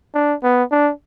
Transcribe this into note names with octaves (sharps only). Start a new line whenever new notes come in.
D4
B3
D4